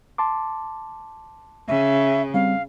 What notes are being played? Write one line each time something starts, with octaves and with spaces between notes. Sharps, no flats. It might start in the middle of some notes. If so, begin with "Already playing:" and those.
A5 C6 D6
C#3 E5
G3 C4 F5